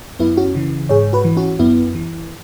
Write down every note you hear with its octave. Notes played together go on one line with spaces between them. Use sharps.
F#2 B3 E4
C#4 F#4
C#3 E3
G#2 G#4 C#5
F#4 B4
E3
C#4 F#4
F#2 B3 E4
E3